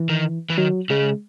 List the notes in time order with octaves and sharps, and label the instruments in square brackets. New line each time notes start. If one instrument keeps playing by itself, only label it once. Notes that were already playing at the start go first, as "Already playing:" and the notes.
Already playing: [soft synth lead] E3
[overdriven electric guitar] D#3
E3
[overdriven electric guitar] D#3 [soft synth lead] F#3
[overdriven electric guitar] C#3 [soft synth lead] G#3